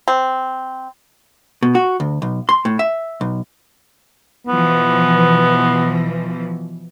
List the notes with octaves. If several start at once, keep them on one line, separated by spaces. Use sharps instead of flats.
C4
B2
F#4
D2
B1
C6
A2
E5
B1
B2 E3 F3 B3